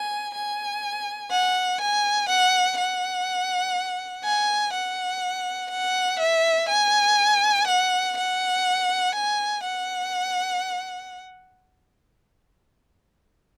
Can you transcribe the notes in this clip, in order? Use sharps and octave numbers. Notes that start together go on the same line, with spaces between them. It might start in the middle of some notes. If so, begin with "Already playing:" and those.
Already playing: G#5
G#5
F#5
G#5
F#5
F#5
G#5
F#5
F#5
E5
G#5
F#5
F#5
G#5
F#5